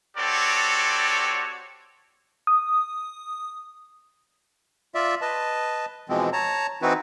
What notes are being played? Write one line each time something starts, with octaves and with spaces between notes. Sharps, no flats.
C4 F#4 G4 A4 C#5 D5
D#6
F4 D5 E5
B4 D#5 A5
B2 E3 F3 G#3 C4
C#5 A5 A#5
E3 C4 D#4 E4 F#4 B4